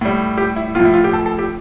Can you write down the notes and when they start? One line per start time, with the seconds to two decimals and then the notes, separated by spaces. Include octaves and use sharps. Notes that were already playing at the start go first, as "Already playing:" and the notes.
0.01 A2 G3
0.38 G4
0.56 E4
0.75 A2 F3 F4
0.85 E4
0.94 F4
1.04 G4
1.13 A4
1.26 A4
1.39 G4